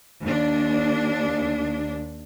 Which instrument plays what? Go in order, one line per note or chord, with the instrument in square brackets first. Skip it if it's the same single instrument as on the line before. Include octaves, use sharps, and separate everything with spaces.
[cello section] D#2 D4